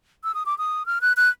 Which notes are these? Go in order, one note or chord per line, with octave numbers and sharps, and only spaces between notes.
E6
D#6
D6
D#6
F6
F#6
F#6